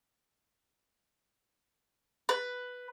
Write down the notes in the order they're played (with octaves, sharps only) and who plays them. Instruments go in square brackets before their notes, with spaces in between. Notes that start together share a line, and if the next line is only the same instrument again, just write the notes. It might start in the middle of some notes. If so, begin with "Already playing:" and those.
[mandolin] B4